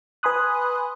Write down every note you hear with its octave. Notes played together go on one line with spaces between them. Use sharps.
B4 G#5 B5 C6 D#6 F#6